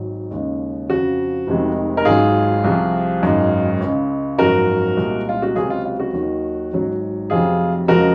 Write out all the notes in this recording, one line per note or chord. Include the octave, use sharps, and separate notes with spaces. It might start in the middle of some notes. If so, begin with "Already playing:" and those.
Already playing: G#1 G#2 F#3
D#2 C#3 G#3
F2 C#3 F3 F#4
F1 F2 C3 D#3 G#3
A#4
G#1 G#2 F#3 F4 G#4
C2 C3 F3
G#1 F#2 D#3 G#3
C#2 C#3 G#3
G#1 F#2 F3 F#4 A#4
C2 A#2 G#3
F4
F#4
C#2 C3 F#3 F4 G#4
F4
F4
F#4
D#2 D#3 F#3
G#1 G#2 F#3
F1 F2 C3 F#3 F4 G#4
F2 C#3 F3 G#3 F#4 A#4